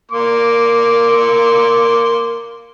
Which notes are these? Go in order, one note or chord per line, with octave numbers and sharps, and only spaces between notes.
A#3 C6 D6